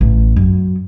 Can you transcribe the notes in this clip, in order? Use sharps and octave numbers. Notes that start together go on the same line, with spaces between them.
A1
F#2